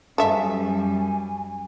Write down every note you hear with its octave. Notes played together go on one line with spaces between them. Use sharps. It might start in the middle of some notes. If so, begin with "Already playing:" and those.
F#2 G3 A4 E5 G#5